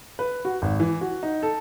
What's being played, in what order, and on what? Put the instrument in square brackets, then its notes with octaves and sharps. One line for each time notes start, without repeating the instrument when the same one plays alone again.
[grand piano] B4
F#4
G#1
E3
F#4
D#4
A4